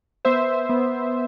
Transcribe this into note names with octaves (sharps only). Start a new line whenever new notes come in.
B3 C5 E5
B3